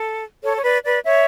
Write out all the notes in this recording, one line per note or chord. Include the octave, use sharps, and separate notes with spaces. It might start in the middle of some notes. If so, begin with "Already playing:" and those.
Already playing: A4
A4 C#5
C#5
B4 D5
B4 D5
C#5 E5